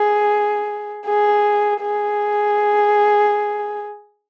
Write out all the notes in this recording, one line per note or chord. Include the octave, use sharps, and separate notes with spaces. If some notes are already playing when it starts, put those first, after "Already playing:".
Already playing: G#4
G#4
G#4